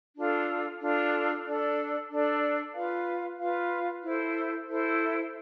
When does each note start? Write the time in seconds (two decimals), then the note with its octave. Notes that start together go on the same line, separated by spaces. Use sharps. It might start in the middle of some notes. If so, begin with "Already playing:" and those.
0.15 D4 F4 A4
0.80 D4 F4 A4
1.45 D4 A4 D5
2.10 D4 A4 D5
2.74 F4 B4 F5
3.38 F4 B4 F5
4.03 E4 A4 C5
4.68 E4 A4 C5